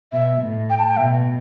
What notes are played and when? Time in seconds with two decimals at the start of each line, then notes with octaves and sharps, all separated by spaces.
0.13 B2 E5
0.41 A2
0.70 G5
0.79 A5
0.88 G5
0.97 B2 E5